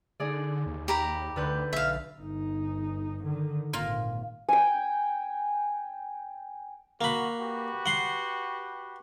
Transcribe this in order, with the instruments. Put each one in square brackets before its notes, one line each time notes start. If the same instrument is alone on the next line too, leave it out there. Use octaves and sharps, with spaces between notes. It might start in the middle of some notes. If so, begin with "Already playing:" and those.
[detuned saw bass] D3 [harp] D#4 G#4 D5
[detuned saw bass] D#2
[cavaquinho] G4 A#5 B5
[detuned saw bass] D2 [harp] D3 B4 G6
[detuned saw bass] B1 [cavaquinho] E5 F5
[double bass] G1 D#4
D3 D#3
[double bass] G#1 A#2 [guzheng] A#3 F4
[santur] G5 G#5
[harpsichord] A#3 B5 [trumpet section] F#4
[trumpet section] F#4 G4 B4
[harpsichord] F#5 C6